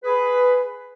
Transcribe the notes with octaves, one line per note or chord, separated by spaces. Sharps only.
G#4 B4